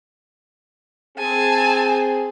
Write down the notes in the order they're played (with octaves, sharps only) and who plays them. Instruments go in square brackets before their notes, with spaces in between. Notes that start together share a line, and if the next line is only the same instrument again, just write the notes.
[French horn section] C4 G#4 [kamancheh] G#5 A5